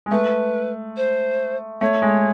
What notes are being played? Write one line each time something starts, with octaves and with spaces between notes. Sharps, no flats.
G#3
A3 B4
C5
A3 C#5
G#3